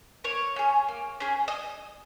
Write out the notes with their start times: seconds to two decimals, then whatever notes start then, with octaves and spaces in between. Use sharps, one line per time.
0.24 A#3 C#5
0.56 C#4 G#4
0.88 A#3
1.20 C#4 G#4
1.48 D#5